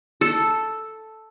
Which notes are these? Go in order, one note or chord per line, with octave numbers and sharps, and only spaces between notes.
A4